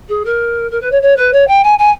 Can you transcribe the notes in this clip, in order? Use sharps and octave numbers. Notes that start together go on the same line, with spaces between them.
G#4
A#4
A#4
B4
C#5
C#5
B4
C#5
G5
G#5
G#5